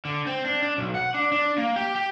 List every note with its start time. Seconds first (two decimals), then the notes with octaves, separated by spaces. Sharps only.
0.05 D3
0.27 C4
0.45 D4
0.63 D4
0.78 B1
0.95 F#5
1.14 D4
1.32 D4
1.58 A#3
1.76 G4
1.95 G4